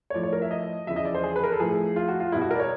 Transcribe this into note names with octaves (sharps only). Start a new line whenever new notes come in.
C#5
A2 F3 D5
C#5
A#4
E5
D#5
E2 C#3 F3 E5
D#5
D5
C5
G#4
B4
A#4
A4
A2 F3 G#4
F4
F#4
F4
B2 G3 E4
F#4
A#4
D5
C#5